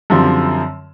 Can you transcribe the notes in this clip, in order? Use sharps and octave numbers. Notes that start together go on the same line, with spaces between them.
F#2 D3 F3 G3 C4